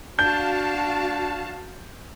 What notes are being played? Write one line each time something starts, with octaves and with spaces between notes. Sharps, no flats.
D4 F#4 F5 A5 G6